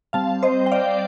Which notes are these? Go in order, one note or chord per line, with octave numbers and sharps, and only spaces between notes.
G3 C4 F5 A5
C5 D#5
G5
D5 F5